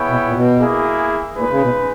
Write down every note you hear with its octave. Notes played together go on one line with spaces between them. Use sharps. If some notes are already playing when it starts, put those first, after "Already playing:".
Already playing: B3 E4 G#4 C#5 G5
B2
A#2
B2
A#3 E4 G#4
A#2 G#3 D#4 G#4 B4
C#3
B2